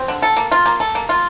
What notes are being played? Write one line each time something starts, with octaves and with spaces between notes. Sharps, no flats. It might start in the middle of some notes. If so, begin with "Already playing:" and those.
Already playing: C4
D3
A4
A#3
F4
A#3
A4
A#3
F4